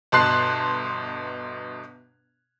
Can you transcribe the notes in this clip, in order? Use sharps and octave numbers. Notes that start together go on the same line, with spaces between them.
G1 B2 A5 C6 F#6 C7